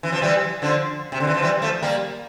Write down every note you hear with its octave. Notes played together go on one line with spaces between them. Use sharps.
E3
F3
E3 G3
D3 F3
C3
D3
E3
F3
E3 G3
F3 A3
G3 A#3